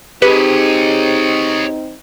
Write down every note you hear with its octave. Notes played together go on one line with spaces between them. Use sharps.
C4 D#4 G4 G#4 B4 C#5 D#5